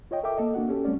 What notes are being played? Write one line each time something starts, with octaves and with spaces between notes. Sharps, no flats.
F4 C#5 D#5 G5
A4 A#4 E5 G5 D6
A#3 A4 D#5
A#3 D4 F#4 F#5
C#4 G4 A4
G3 A3 C4 C#4 D5